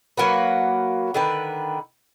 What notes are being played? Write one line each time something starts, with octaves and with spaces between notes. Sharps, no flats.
F#3 A#3 F#4 B4
D3 D#3 B4